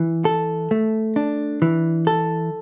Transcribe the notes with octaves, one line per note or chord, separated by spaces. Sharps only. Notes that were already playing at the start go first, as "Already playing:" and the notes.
Already playing: E3
A4
A3
D4
E3
A4